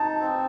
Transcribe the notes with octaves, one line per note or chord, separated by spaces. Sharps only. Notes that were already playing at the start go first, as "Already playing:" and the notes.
Already playing: D#4 A5
C4